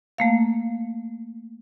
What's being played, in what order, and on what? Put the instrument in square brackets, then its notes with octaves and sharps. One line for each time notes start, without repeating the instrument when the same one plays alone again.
[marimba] A3 A#3 F5